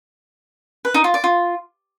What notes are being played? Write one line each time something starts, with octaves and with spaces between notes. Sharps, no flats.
B4
D#4
F4
D5
F4